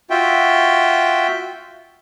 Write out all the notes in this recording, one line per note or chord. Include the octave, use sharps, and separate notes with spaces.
F4 F#4 E5 G5